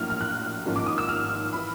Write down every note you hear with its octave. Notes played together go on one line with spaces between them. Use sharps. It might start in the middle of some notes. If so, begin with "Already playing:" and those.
Already playing: A#1 A2 F#3 A#3 F6
F6
F#6
G#1 G#2 F3 A#3 C#4
D6
D#6
E6
F6
E3 B5